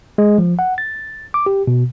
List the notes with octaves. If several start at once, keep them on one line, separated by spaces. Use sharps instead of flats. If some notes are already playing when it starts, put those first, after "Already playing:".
G#3
F3
F#5
A6
D6
G4
B2